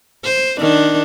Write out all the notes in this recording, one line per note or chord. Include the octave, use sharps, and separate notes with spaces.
C5
D#3 D4